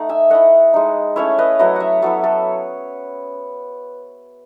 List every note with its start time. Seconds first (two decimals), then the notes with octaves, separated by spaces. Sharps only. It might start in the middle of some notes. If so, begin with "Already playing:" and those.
Already playing: A3 D#4 F#5
0.09 E5 G#5
0.30 A3 E4 D#5 F#5
0.74 G#3 D#4
1.16 A3 C#4 E4 C#5 E5
1.39 B4 D#5
1.59 F#3 A3 E4 B4 D#5
1.76 C#5 E5 F#5
2.02 F#3 B3 E4 A4 C#5
2.24 A4 C#5